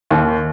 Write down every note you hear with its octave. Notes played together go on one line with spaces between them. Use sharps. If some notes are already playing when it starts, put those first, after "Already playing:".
D#2